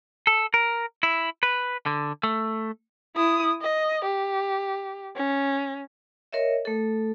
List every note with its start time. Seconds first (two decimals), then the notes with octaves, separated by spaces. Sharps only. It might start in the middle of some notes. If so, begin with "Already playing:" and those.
0.27 A4
0.54 A#4
1.03 E4
1.43 B4
1.86 D3
2.23 A3
3.16 E4 D#6
3.62 D#5
4.05 G4
5.16 C#4
6.32 A#4 C#5 D#5 E5
6.65 A3 A4